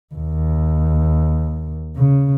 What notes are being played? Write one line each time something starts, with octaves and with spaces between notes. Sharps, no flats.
D#2
C#3